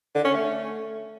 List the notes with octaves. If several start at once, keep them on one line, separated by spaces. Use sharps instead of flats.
D3
C#4
A3